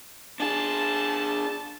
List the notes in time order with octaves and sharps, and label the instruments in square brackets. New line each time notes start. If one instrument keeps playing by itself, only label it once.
[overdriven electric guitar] D4 G#4 [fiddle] A5